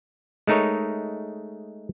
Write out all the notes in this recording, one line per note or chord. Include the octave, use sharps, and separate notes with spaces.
G#3 A3 D#4 A#4 C#5